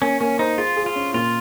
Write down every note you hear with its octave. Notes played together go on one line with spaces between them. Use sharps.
A#3 C#4
A#3 C#4
D#4 C5
F4 G#4
G#4
F4
C#4
A#2 F4